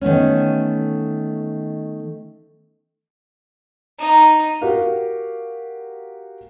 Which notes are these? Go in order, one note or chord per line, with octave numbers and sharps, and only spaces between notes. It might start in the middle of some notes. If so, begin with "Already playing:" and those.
D#3 A3 B3 C#4
D#4 A#5
F#4 G4 A#4 F5